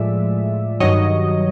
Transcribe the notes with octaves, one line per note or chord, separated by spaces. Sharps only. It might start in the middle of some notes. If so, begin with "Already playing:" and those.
Already playing: A2 F3 G#3 D5 E5
G2 D#3 F#3 C#5 D#5